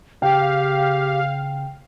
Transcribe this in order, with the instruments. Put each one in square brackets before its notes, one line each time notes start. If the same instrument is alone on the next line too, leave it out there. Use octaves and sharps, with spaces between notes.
[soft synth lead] C#3 [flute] G4 [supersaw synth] F5 [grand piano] G5